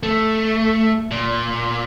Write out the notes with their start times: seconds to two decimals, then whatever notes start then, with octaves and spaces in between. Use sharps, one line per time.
0.03 A3
1.11 A#2